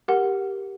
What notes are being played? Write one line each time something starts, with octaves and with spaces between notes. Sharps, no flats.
G4 A#4 F#5